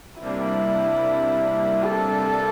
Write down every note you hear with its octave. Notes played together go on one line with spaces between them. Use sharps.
C3 G3 A#3 D4 E4
A4